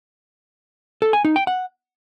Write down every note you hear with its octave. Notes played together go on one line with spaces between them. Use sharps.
A4
G#5
D#4
G5
F#5